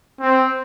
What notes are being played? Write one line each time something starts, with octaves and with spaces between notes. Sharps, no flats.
C4